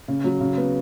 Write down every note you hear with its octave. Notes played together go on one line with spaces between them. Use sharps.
C#3
F#3
C#3
B3